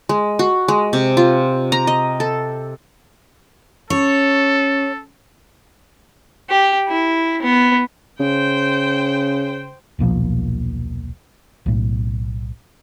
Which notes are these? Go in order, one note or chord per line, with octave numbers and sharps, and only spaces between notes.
G#3
F#4
G#3
C3
F4
A#5
D#5
A4
C#4 A4 C#5
G4
E4
B3
C#3 C5 G5
D#1 B1 A#2 F3
B1 A2